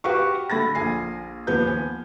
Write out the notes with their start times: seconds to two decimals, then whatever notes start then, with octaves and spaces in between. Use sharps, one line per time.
0.04 F#4 G4 B4 F5 C#6
0.50 D3 A3 B5 A6 A#6
0.75 A#1 F4 G#5 C7
1.47 D#2 F3 B3 G6
1.67 G#5